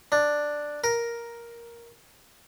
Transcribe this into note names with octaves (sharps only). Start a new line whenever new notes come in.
D4
A#4